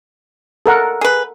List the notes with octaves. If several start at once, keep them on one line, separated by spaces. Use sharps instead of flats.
A4 A#4 F#5
G#4 B4